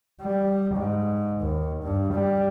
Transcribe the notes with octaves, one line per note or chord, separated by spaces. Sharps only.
G3
G#2
D#2
G2
G3